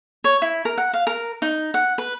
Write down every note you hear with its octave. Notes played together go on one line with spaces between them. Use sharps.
C#5
E4
A#4
F#5
F5
A#4
D#4
F#5
B4